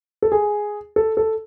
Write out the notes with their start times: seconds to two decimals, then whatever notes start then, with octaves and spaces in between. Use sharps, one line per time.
0.22 A4
0.32 G#4
0.96 A4
1.17 A4